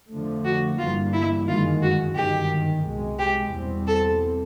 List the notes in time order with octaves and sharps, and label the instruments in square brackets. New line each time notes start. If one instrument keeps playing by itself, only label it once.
[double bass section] F2 D3 F3 A3
[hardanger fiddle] F#4
[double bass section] G1 G2 E3 G3 A#3 [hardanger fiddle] F4
[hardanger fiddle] E4
[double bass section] G1 F#2 D#3 G#3 [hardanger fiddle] F4
[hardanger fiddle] F#4
[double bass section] G1 F#2 D#3 [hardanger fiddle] G4
[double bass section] C2 B2 G#3
[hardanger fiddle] G4
[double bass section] E2 B2 G3 C4
[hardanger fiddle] A4